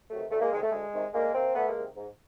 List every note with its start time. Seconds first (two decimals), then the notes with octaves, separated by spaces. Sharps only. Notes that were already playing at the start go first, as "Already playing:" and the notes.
0.10 C3 D#3 F#3 A3
0.31 D2 A3
0.41 G#3 A#3
0.52 C3 D#3 G#3
0.62 A3
0.72 D2 G#3
0.93 C3 D#3
1.13 D2 G#3 A#3
1.34 C3 D#3 A#3 C4
1.55 D2 A3 B3
1.69 G#3 A#3
1.76 C3 D#3
1.96 G#2